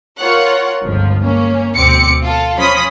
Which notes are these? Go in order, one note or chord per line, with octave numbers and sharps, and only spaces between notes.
F4 A#4 C#5 F#5
G1 C#2 F3
A#3 C#4
D2 B2 C4 D6 C#7
F4 A4
F3 C#4 B5 C6 D#6 B6